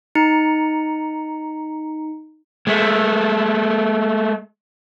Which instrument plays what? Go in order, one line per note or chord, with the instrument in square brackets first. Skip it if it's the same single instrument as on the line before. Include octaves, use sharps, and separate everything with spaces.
[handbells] D#4 A#5 C#7
[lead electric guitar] G#3 A3